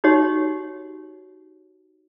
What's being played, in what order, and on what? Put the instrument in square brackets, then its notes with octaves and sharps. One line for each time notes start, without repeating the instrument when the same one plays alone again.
[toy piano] D#4 F#4 G4 C#5